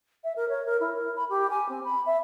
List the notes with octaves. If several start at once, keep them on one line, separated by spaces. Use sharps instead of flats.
E5
A#4
C#5
A#4
E4
A#4
B5
G4
G#5
C4
B5
E5